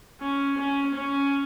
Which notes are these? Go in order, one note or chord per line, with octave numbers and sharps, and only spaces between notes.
C#4
C#4
C#4